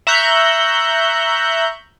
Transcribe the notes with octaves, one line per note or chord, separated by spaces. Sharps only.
E5 A#5 C#6 F#6 G6